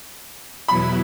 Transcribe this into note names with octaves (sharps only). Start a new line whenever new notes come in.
E2 B2 F#3 B3 E4 B5